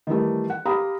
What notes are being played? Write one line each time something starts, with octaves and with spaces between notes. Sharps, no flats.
D#3 E3 G3 A3
F#5
G4 F5 A#5 B5 D#6